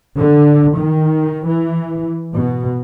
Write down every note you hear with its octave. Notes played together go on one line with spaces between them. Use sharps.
D3
D#3
E3
B2